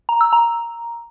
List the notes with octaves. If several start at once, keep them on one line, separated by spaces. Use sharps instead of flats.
A#5
E6
A#5